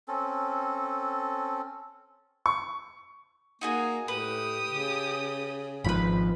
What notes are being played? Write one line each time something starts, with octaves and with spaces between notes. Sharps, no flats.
C4 C#4 A4
C#6
A#3 D#4 F#4 G#4
A2 G4 B4 D#6
C#3
G#1 G#2 F3 B4 B5